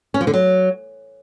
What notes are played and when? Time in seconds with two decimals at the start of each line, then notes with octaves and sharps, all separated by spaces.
0.14 C#4
0.21 F3
0.27 D3
0.34 F#3